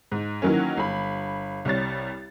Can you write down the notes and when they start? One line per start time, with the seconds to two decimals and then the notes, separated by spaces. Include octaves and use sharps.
0.12 G#2
0.42 D#3 E3 F#3 A#3 C#4
0.77 G1 B5
1.65 C2 G3 C#5 A6